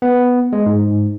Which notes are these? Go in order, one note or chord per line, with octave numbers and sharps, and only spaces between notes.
B3
G#3
G#2